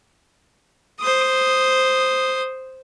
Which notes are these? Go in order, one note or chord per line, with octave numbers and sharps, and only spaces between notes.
C5 D#6